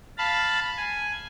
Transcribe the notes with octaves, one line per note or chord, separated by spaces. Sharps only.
F5 A5 B5
G#5